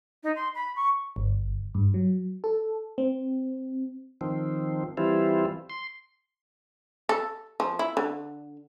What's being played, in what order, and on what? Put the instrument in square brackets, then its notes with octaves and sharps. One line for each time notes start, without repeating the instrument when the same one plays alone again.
[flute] D#4
C6
B5
C#6
[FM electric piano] G1
G2
F#3
A4
C4
[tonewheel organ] D#3 F3 C4
E3 G3 C4 E4 F4
C6
[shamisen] A4
F3
E4
D3